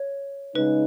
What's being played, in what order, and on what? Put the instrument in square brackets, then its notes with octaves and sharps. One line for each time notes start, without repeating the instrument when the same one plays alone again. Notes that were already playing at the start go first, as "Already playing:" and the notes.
Already playing: [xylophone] C#5
[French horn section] C#3 G#3 D#4 [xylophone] B4